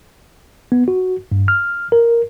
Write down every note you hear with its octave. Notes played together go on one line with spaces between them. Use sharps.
B3
F#4
G2
F6
A#4